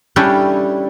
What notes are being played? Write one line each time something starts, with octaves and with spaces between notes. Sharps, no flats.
G3 C#4 D4 E4 G4 A4